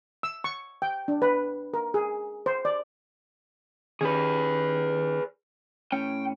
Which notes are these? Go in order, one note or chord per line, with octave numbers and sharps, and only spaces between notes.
E6
C#6
G5
D4
B4
A#4
G#4
C5
D5
D#3 C#4 G4 G#4 B4
A2 C#4 G5